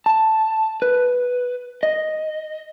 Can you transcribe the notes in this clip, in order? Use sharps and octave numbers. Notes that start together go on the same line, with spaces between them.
A5
B4
D#5